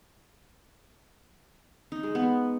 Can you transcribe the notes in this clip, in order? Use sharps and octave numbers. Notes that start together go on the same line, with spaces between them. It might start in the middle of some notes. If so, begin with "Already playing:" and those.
D#4
G#3
B3